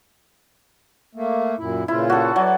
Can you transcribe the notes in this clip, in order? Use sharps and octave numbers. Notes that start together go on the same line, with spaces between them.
A3 A#3
F#2 A#2 E4
A#2 C#3 E4 F4
F#4 A4
F#3 D5